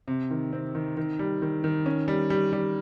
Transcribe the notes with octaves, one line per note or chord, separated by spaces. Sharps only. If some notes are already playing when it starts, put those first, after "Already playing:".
C3
D#3
C4
D#3
D#3
G3
D#3
D#3
C#4
G3
G3
G3